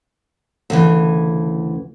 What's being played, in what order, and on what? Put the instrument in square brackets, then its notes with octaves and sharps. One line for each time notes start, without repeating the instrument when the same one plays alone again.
[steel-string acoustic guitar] D2 C#3 E3